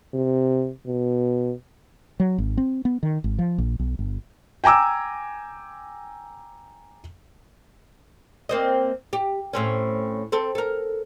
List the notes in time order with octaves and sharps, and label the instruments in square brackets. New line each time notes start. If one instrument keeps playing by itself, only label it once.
[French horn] C3
B2
[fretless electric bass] F#3
G#1
C4
B3
D#3
G#1
F3
A#1
B1
G1
[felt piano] G5 G#5 A#5 D6 E6
[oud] A#3 C4 D#5
G4
A2 C4 C#4
C4 A4
A4 A#4